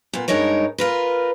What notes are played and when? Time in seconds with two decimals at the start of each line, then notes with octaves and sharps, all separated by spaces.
0.13 A#2 B3
0.28 G2 G#3 D#4 A#4 C#5
0.78 F4 A#4 B4